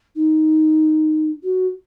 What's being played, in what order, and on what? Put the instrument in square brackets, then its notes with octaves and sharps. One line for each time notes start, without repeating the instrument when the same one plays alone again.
[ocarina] D#4
F#4